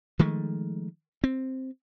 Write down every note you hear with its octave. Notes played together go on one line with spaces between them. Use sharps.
D#3 F3 G#3 A3
C4